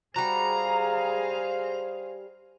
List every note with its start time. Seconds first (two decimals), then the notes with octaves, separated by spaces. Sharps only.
0.16 G3 F#4 G#4 C5 F5 A#5